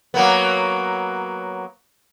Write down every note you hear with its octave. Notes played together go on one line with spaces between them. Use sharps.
F#3 A#3 B3